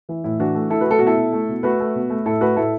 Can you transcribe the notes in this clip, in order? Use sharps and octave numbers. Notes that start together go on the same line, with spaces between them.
E3 E4
A2 E4
E3 D4 F#4
A3
A3 E4 A4
F#4 B4
A3 A4
B2 F#4
E4 A4
B2
A3
B2
A3 F#4 B4
A3
B2
A3
A2 E4 A4
A3 F#4 B4
A2 E4 A4